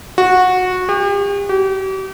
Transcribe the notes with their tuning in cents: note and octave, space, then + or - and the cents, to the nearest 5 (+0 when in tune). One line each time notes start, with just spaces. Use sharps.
F#4 -15
G4 +40
G4 -40